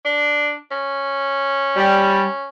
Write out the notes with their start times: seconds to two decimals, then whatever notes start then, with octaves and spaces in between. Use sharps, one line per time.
0.05 D4
0.71 C#4
1.76 G3